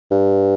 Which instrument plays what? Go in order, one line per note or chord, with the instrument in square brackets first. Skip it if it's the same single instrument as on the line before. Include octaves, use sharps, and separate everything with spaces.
[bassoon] G2